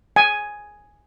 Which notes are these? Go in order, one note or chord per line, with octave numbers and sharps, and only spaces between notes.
G#5